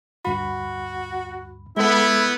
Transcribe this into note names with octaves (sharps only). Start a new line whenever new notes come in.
D2 G2 F#4 B5
G#3 B3 E4 A4 E5